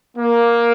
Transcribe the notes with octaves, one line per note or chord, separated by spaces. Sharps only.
A#3